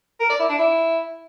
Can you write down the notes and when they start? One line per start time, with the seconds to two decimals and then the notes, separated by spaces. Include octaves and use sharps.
0.20 A#4
0.30 D5
0.39 E4
0.49 D4
0.59 E4